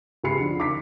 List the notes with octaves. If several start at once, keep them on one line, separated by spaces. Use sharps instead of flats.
C#2 G4 G#5 B5 C7 C#7
D3 F3
D#3 D6 B6